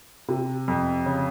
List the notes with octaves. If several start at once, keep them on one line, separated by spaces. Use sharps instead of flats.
C3
F2
C#3